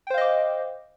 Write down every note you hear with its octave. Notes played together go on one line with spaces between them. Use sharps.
C5 D#5 F5 G5 D6